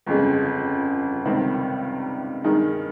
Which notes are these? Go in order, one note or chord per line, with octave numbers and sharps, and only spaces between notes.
G1 F2 C#3 G#3
C#2 C3 D#3 G3 C4
G2 D#3 G#3 D#4